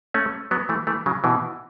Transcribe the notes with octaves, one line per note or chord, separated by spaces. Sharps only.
A3 C#4
F#3 B3
E3 A3
E3 A3
C#3 F#3
B2 E3